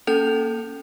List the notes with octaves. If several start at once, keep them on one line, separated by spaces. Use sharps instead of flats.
A#3 C#4 A4 G5 G6 F7